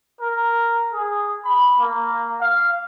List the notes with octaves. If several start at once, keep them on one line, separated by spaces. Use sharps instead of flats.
A#4
G#4
B5
A#3
F5